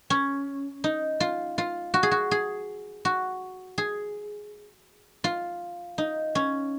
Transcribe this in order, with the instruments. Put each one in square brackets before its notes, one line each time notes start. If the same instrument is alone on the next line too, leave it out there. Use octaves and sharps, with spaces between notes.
[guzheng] C#4
D#4
F4
F4
F#4
G#4
F#4
G#4
F#4
G#4
F4
D#4
C#4